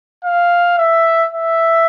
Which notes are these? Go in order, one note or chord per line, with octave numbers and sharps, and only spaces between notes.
F5
E5
E5